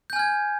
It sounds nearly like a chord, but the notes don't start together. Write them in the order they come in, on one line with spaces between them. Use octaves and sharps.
G6 G#5 F6 G#6